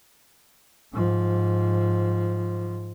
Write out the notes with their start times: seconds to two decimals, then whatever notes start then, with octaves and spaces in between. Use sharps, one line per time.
0.93 G#2 F3